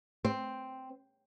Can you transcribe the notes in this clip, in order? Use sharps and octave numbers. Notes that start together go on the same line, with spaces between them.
C4